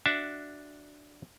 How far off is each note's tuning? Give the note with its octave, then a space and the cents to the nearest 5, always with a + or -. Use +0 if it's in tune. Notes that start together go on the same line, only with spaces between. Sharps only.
D4 +0 F#4 +0 E5 +0